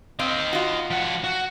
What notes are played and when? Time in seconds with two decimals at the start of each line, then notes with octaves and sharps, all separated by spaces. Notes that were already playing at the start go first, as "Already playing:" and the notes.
0.19 C4 D#4 F5
0.53 F4 F#4
0.90 F3 F#5
1.24 F#4